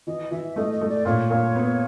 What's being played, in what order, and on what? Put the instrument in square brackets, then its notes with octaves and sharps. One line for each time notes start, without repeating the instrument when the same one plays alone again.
[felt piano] E3 [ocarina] D#5
[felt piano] E3 [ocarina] E5
[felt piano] A3 [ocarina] D#5
[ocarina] D#5
[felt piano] A3
[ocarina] D5
[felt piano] A#2 [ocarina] C#5
[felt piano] A#2
B3